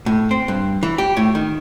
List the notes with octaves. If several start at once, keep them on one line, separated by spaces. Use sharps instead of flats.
A2
C4
G2
E3
G4
A2
D#3